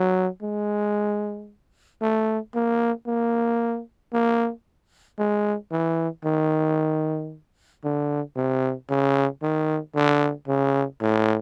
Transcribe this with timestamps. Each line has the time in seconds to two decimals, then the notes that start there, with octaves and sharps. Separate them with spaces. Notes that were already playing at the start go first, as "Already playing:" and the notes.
Already playing: F#3
0.42 G#3
2.02 A3
2.55 A#3
3.07 A#3
4.13 A#3
5.19 G#3
5.71 E3
6.25 D#3
7.84 D3
8.36 C3
8.90 C#3
9.42 D#3
9.95 D3
10.48 C#3
11.01 A2